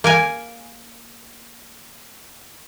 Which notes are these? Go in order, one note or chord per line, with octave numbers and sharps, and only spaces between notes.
A#3 A#4 G#5